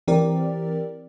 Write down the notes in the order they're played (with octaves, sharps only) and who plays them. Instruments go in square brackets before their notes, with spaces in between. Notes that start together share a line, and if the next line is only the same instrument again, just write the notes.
[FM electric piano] E3 C4 G4 A#4 D5